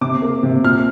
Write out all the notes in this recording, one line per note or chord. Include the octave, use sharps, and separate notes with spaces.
C3 D6
A#3
C3
A#2 F6